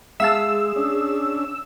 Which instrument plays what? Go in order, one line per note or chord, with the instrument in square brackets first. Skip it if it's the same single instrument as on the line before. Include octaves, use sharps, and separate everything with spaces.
[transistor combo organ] G#3 [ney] G#4 [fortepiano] E5 F5 A5 [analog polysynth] E6
[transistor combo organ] C#4 D4